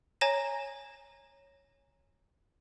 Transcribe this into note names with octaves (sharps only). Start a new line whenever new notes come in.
C#5 G#5 A#5 A#6 E7